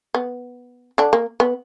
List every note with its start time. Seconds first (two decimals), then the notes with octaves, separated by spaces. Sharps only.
0.14 B3
0.98 D3 D4
1.13 A#3
1.40 B3